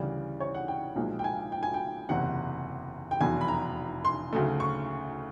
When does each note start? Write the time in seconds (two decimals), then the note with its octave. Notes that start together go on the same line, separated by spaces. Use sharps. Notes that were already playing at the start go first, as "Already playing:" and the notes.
Already playing: D2 C#3 E3 G3 D5
0.40 C#5
0.54 F#5
0.68 G5
0.96 B1 A#2 F3 G#3
1.19 G5
1.24 G#5
1.52 G5
1.63 G#5
1.74 G5
2.09 F#1 E2 C3 F#5
3.11 G5
3.20 F1 E2 B2 F#3 G#5
3.41 B5
3.48 A#5
4.05 C6
4.33 D2 C#3 F#3 A3
4.60 C#6